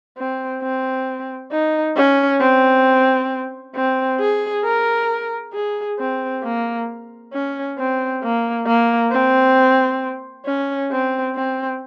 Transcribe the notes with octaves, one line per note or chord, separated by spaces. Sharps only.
C4
C4
D#4
C#4
C4
C4
G#4
A#4
G#4
C4
A#3
C#4
C4
A#3
A#3
C4
C#4
C4
C4